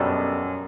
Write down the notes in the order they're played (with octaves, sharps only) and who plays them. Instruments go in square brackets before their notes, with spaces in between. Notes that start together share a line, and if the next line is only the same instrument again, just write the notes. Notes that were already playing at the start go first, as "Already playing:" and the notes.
Already playing: [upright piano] F#2 [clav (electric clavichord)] B2 G3 D4 A4